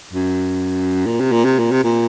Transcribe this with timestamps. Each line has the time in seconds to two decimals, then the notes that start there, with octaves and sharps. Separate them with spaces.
0.13 F#2
1.06 A#2
1.20 C3
1.32 A#2
1.45 C3
1.59 A#2
1.72 C3
1.84 A#2